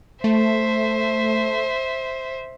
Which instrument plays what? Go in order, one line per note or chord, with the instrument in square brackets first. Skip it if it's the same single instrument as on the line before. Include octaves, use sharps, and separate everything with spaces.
[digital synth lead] A3 [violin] C5 E5